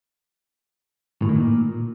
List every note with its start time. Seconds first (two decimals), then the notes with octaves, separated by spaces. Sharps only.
1.22 A2
1.29 D#3
1.36 A#2